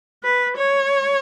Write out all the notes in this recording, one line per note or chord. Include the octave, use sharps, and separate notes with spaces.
B4
C#5